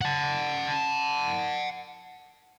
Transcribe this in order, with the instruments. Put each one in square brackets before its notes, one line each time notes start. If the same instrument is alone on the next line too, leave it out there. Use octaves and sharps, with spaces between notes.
[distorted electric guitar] F#5 A5